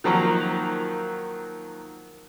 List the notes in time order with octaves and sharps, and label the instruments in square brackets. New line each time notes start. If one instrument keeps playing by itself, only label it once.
[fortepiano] D#3 F3 F#3 A#3 A#5